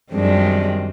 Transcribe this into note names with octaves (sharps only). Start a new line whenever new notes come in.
F#2 D#3 G3 G#3 C4 D4